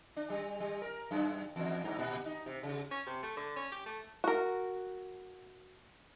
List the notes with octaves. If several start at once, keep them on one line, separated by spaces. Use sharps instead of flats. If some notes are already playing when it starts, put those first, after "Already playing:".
D4
G3
G3
A#4
F#2
E2
G2
A#2
D#4
C3
C#3
C#4
C3
A3
D3
C#4
G4
A3
F#4 A#4